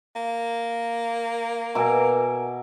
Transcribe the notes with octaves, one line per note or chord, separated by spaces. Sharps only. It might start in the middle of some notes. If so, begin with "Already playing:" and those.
A#3
B2 A#4 E5 G#5 A#5 D6